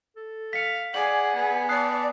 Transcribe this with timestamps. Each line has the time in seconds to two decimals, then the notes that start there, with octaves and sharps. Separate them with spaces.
0.16 A4
0.53 F5 B6 C#7
0.94 G#4 D5 F#5 G#5 F#7
1.35 B3
1.69 D5 A5 D#6 F#6 C7